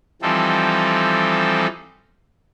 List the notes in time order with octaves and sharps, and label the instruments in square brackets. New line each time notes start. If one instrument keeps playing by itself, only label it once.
[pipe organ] E3 F3 G3 C4 D#4 A4